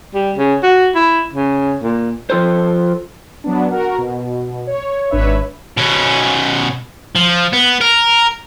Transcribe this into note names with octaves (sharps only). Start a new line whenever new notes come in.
G3
C#3
F#4
E4
C#3
A#2
F3 F4 A4 C5
F#3 B3 D4
F#4 A#4
B2
C#5
G#1 D4 B4 C#5 E5
B2 C#4
F3
B3
A#4